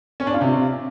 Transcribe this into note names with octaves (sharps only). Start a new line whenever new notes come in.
C#4
D4
F4
C3